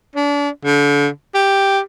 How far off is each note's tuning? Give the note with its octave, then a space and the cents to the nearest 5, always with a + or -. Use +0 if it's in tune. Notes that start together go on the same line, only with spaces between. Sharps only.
D4 -35
D3 -35
G4 +0